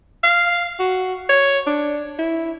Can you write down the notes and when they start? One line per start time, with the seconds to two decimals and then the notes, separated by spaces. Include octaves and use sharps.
0.24 F5
0.79 F#4
1.29 C#5
1.67 D4
2.19 E4